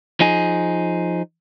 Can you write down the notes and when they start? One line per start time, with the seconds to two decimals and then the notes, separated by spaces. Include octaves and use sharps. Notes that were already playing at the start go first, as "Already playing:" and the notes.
0.20 F3 D#4 G#4